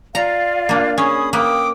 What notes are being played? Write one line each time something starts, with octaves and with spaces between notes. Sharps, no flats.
F4 D5 F5 A#5
A#3 D4
C#4 G#4 B5 D#6
A#3 B4 G5 D6 D#6